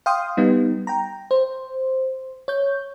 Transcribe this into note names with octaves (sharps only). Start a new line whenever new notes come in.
F5 G5 C6 D#6
G3 B3 D#4
G5 A#5
C5
C#5 G6